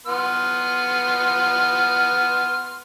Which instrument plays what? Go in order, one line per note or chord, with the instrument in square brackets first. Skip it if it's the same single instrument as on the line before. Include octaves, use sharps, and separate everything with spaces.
[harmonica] B3 C6 F6